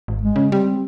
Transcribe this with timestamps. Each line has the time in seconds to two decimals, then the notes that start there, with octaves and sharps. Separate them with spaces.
0.08 G#1
0.22 G#3
0.36 C#3
0.52 G3 C4